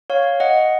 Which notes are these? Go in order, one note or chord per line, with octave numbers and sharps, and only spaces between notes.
C#5 F5
D#5 F#5